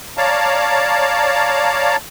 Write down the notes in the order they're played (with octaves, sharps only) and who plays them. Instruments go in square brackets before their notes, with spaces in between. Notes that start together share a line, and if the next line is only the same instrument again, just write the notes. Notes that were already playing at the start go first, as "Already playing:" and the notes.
[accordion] C#5 D5 F5 A5 A#5